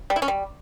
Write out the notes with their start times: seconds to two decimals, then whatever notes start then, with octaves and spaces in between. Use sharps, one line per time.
0.10 G3
0.16 E4
0.22 C#4
0.28 G3